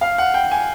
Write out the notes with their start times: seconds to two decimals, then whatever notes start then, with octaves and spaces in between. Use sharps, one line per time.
0.01 F5
0.18 F#5
0.34 G5
0.51 G#5